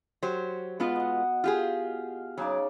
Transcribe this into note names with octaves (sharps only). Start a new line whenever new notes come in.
F#3 G4 C5
B2 G#3 B3 F4
D#5 F#5
F4 G4 G#4 F5
C#3 F#3 D#4 D5